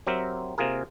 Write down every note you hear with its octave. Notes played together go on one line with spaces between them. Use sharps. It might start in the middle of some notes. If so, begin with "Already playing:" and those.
F#3 C4 G4 A#4 E5
C3 A#3 F4 G#4 A#4